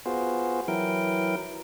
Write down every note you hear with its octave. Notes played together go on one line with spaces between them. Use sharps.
B3 F4 F#4 G#4 C5
E3 F#3 E4 A#4 G5